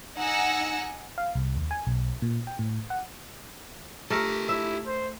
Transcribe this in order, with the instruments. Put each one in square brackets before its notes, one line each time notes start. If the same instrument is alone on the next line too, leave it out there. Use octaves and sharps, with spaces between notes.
[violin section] D#4 F#5 G#5 E6 A#6 C#7
[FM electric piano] F5
C2
D#2
G#5
B1
A#2
G5
A2
F#5
[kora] A3 A#4 [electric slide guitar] G4 A4
[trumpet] E4 [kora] E5
[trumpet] C5